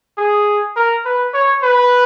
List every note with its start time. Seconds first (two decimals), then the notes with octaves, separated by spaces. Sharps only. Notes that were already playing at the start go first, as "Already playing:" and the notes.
0.18 G#4
0.76 A#4
1.05 B4
1.34 C#5
1.63 B4